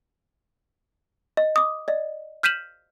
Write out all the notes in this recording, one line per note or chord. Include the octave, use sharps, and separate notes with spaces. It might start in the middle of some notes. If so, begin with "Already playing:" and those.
D#5
D6 D#6
D5 D#5
F6 G6 B6 D#7 E7 F#7